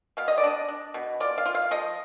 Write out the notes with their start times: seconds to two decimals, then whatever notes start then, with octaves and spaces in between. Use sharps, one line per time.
0.17 B2 F5
0.28 D#5
0.38 D5
0.44 D4 D#5
0.68 D4
0.94 B2
1.20 F4 D5
1.38 F5
1.46 F4
1.54 F5
1.71 F3 D#5